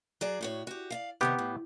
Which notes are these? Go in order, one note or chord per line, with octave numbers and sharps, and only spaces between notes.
F#3 G#4 D5
A2 F#4 C#5
F#4 G4
D5 E5 F5
C3 D#3 G3 B3 G4
A2